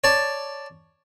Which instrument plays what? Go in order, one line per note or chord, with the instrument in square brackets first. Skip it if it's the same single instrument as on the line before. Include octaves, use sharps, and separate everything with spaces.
[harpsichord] C#5 D5 A5